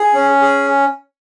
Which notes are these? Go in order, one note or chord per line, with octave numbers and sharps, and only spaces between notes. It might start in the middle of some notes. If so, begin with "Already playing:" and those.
Already playing: G#4
C#4
G#4